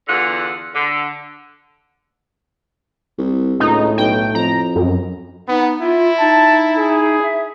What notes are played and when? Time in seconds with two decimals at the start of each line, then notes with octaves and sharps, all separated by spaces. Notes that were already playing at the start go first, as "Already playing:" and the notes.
0.08 E2 D3 F4 F#5
0.75 D3
3.18 C2
3.60 C#2 A2 D#4
3.98 B1 G5
4.35 F2 A#5
4.75 F#2
5.48 B3 D#4
5.81 E4 F4
6.19 D#4 A5
6.78 G#4
7.22 E5